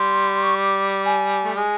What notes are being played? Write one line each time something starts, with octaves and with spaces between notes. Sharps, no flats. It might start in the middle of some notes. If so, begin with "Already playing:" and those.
Already playing: G3 C6
C#6
D6
G#5
A3
G#3 G#5